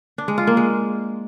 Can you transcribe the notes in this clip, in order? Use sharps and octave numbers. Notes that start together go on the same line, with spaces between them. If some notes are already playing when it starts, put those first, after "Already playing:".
D4
G#3
F4
A#3
G#3